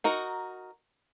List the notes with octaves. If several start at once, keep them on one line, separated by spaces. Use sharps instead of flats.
D#4 F#4 A#4